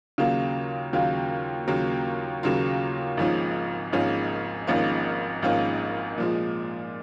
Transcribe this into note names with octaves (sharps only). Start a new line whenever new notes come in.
D#2 C#3 F#3 A#3 F4
D#2 C#3 F#3 A#3 F4
D#2 C#3 F#3 A#3 F4
D#2 C#3 F#3 A#3 F4
G#1 G#2 F3 A#3 C#4
G#1 G#2 F3 A#3 C#4
G#1 G#2 F3 A#3 C#4
G#1 G#2 F3 A#3 C#4
A#2 F3 G#3